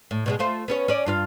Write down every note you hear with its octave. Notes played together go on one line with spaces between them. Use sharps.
A2
B2 F#3 G#3
A3 F4 C5
B3 C#4 C#5
C#4 D5
G2 F4 F5